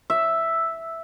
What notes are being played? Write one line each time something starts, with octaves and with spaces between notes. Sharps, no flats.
E5